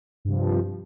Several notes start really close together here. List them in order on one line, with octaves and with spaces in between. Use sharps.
G2 C3 F3